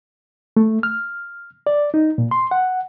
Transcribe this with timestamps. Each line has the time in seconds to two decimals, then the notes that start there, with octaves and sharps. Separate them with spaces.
0.57 A3
0.83 F6
1.67 D5
1.94 D#4
2.18 A#2
2.31 C6
2.51 F#5